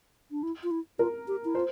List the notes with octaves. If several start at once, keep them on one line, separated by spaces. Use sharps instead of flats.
D4
E4
F4
E4
F4 A#4
G4
E4
F4 C5